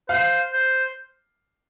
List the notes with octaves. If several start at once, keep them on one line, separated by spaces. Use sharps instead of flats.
C5 F5
C5